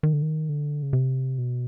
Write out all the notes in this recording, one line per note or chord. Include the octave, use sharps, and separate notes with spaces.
D#3
D3
D#3
D3
C#3
C3
B2